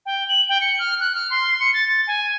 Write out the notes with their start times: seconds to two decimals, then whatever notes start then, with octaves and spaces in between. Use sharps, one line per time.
0.06 G5
0.28 F#7
0.49 G5
0.61 C#7
0.79 F6
1.00 F#6
1.15 F6
1.30 C6
1.60 C#7
1.74 A6
1.88 A6
2.07 G#5